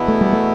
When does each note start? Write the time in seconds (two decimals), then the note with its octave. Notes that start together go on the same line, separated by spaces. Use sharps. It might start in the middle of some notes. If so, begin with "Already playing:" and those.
Already playing: E2 B2 B3 E4
0.08 A3
0.21 G3
0.33 A3